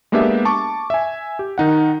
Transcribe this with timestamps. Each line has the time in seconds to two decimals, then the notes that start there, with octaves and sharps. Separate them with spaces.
0.12 G#3 A#3 B3 D4 G4 E5
0.45 A5 C#6 D6
0.90 E5 G#5
1.39 G4
1.58 D#3 D#4 F#5